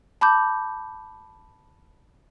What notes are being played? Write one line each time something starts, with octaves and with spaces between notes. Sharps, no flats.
A5 B5 D6 G6